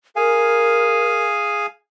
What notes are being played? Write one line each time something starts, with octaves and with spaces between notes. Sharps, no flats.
G#4 A#4 F5 G#5